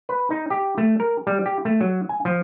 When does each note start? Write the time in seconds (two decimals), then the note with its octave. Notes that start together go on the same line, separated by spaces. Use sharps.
0.09 B4
0.30 D#4
0.50 G4
0.78 A3
1.00 A#4
1.27 G3
1.46 G4
1.65 A3
1.81 F#3
2.09 G#5
2.25 F3